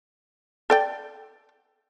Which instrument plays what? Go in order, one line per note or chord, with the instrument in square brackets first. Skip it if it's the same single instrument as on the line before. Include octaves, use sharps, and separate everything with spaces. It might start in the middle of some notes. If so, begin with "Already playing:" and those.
[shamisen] A4 D5 G5